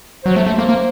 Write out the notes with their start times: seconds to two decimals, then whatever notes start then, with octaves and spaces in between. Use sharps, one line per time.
0.24 F#3 C5
0.36 A3
0.46 A3
0.58 A#3
0.69 A#3